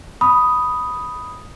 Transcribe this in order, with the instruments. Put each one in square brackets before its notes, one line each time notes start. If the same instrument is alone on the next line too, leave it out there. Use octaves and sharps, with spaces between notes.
[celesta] B5 D#6